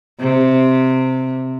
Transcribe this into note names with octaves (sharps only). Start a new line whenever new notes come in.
C3